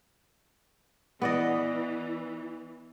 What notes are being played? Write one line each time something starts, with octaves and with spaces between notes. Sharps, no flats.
E3 B3 D5 D#5